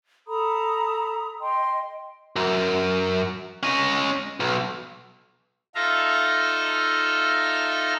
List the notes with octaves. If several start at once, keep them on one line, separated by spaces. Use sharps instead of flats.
A4 A#5 B5 D#6
D#5 G5 C6
F#2
C#4 D#5
B1
D#4 F4 A4 E5 F5 A#5